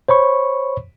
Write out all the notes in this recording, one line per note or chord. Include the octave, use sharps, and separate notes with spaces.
C5 C#5 B5 C#6